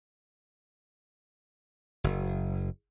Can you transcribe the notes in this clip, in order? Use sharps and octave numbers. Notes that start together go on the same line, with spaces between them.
F#1